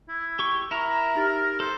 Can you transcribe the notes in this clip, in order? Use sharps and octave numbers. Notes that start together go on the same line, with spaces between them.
E4
G4 C#6
E4 A#4 A#5
D#4 G4 A6
A4 C5